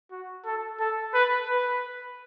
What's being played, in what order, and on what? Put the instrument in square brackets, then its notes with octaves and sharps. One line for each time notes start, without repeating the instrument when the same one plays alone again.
[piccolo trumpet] F#4
A4
A4
B4
B4